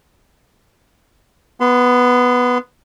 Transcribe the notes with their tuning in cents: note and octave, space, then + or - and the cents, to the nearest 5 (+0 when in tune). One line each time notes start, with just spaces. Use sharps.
B3 +0 C6 -40